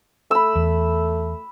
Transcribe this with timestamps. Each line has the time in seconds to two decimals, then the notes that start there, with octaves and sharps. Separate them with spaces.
0.31 A3 B5 E6
0.55 E2